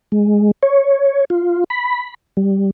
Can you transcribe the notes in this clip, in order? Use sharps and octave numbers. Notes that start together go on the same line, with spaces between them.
G#3
C#5
F4
B5
G3